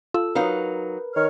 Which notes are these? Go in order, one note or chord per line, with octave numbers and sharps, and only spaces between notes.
F4 A4 E6
F#3 D#4 A#4 B4 F5
D#3 C#5 F6